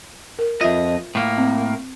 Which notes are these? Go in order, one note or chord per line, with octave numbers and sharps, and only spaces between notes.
A#4
F2 F4 D#5 E5
A2 A#3
C4